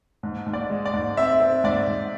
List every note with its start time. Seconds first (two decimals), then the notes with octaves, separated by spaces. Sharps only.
0.23 G#2
0.46 G#2
0.53 D5
0.70 G#3
0.85 D5
0.93 G#2
1.17 C4 E5
1.40 C4
1.64 G#2 D5
1.87 G#2